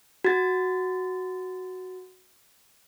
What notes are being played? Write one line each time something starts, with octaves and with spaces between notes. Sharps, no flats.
F#4 A6